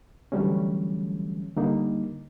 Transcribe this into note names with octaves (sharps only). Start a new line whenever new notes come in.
D3 E3 F#3 G3 A3 C#4
D3 G3 A#3 D#4